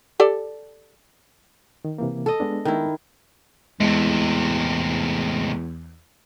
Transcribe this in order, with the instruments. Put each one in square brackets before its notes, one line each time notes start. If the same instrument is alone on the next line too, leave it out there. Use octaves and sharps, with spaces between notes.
[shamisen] G4 A4 D5
[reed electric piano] D#3
C3 E3 A#3
[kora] A4 D#5
[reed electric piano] G#3 B3 D4
[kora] D#3 E4
[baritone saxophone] E2 [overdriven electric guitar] A2 C3 [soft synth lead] G#3